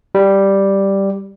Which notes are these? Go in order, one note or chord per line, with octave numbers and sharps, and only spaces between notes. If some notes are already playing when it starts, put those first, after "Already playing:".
G3